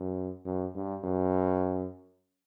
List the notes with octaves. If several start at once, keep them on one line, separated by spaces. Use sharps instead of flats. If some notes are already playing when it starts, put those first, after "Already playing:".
Already playing: F#2
F#2
G2
F#2